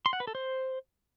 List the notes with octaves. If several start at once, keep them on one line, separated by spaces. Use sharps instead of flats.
C6
F#5
B4
A4
C5